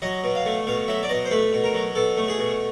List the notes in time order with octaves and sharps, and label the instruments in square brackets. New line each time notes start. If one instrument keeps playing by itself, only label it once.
[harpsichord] F#3 D#5
B2
F5
A3
B2 F5
F#3 E5
D5
B2 D#5
C5
A3 B4
B2
A#4
F#3
B2 A4
A3
G#4
B2